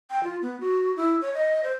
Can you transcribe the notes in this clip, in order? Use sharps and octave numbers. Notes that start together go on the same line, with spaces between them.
G5
F4
B3
F#4
E4
C#5
D#5
C5